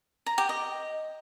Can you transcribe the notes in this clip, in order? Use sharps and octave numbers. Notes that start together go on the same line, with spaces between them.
A#5
G4
D#5